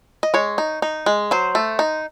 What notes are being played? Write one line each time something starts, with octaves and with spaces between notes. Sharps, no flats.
D#5
G#3 C#5
D#4
D#4
G#3
F#3 C5
A3
D#4